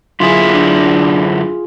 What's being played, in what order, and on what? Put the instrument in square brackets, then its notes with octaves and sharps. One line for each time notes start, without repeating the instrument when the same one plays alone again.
[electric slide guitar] F#2 D3 E4 [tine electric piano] F4 G#4
[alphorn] D4